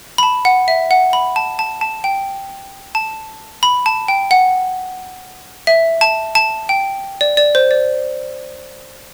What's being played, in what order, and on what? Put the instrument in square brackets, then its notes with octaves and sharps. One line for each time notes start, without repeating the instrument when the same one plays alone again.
[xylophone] B5
A5
F#5
E5
F#5
B5
A5
A5
A5
G5
A5
B5
A5
G5
F#5
E5
A5
A5
G5
D5
D5
C5
D5